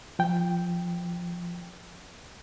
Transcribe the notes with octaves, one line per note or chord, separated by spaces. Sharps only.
F3 G5